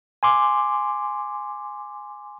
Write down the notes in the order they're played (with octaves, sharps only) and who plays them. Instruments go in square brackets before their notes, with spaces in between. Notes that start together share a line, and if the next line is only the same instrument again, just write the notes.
[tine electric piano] G#5 C6 D6